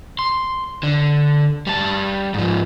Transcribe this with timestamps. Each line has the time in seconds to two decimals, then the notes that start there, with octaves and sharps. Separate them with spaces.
0.19 C6
0.83 D3
1.67 G3 A5
2.34 G#2 F3